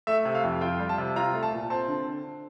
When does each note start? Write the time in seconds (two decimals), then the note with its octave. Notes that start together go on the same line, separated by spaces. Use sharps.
0.07 A3 E5
0.25 C3
0.35 F5
0.44 F2
0.61 F4 G5
0.80 G3
0.89 A5
0.98 C3
1.16 F4 A#5
1.34 A3
1.43 A5
1.53 A#2
1.70 C4 A5
1.88 D3